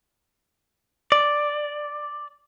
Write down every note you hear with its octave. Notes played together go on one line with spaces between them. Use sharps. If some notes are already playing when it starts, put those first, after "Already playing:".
D5